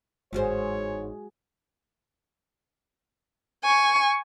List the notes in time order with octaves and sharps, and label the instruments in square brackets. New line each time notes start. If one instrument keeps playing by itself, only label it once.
[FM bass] G1 [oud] E2 G#2 C5 [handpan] G#3 F#4 G#4 [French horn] C#5
[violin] G#5 C#6